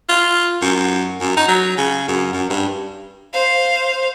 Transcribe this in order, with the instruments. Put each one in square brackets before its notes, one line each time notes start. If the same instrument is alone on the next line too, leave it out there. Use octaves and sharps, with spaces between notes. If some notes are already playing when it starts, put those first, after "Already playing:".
[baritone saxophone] F4
F#2
F#2
D#4
F#3
C#3
F#2
F#2
G2
[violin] C5 F5